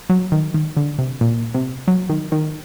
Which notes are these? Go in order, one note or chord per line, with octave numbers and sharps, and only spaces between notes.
F#3
D#3
D#3
D3
C3
A#2
C3
F#3
D#3
D#3